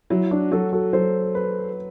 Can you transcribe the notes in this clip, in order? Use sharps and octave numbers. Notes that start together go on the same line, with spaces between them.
F#3 E4
D4 F#4
F#3 F#4 A4
F#4 A4
F#3 A4 C5
B4